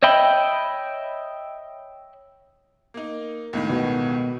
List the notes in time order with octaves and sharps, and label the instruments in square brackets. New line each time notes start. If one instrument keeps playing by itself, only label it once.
[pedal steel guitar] C#5 D#5 E5 G5 B5
[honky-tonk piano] A#3 D#4
C#2 A2 D#3
[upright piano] B2